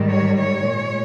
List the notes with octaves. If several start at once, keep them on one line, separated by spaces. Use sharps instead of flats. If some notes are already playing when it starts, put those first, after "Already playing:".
Already playing: G#2 D#3 G3
C#5
C#5
A#2 G#3